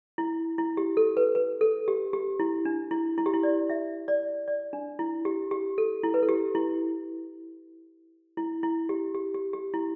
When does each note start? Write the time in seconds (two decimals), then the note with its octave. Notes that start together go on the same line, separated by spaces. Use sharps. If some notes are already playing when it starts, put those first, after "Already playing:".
0.18 E4
0.58 E4
0.77 G4
0.97 A4
1.17 B4
1.35 B4
1.61 A4
1.88 G4
2.13 G4
2.40 E4
2.65 D4
2.91 E4
3.18 E4
3.26 G4
3.34 E4
3.43 D5
3.70 E5
4.08 D5
4.48 D5
4.73 D4
4.99 E4
5.25 G4
5.51 G4
5.78 A4
6.03 E4
6.14 B4
6.23 A4
6.29 G4
6.55 E4
8.37 E4
8.63 E4
8.89 G4
9.14 G4
9.34 G4
9.53 G4
9.74 E4